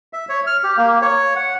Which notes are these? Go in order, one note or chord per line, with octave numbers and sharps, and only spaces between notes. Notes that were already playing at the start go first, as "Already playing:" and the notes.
E5
C#5
F6
G4
A#3
C#5
F#5